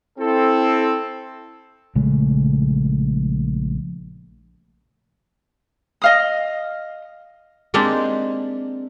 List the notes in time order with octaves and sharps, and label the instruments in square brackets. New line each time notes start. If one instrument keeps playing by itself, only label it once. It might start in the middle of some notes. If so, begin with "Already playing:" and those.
[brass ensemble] C4 E4 A4
[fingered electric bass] A#1 C#3 G#3 A3
[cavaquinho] D#5 F5 D#6
[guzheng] G#3 A#3 C4 D4 D#4 G4